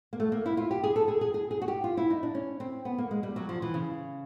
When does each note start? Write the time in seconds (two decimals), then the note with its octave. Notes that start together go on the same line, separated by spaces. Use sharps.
0.13 A#3
0.20 A3
0.32 A#3
0.46 E4
0.57 F4
0.71 G4
0.84 G#4
0.96 A4
1.08 G#4
1.21 G#4
1.34 G#4
1.51 G#4
1.62 F#4
1.68 G4
1.84 F4
1.97 E4
2.10 D#4
2.23 D4
2.35 C#4
2.60 C4
2.85 B3
2.98 A#3
3.11 G#3
3.23 G3
3.36 F#3
3.49 F3
3.62 E3
3.74 C#3